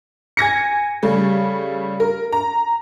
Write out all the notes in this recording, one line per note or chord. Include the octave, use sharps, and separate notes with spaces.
G#5 G#6 A#6 C#7
C#3 G3 A3
A#4
A#5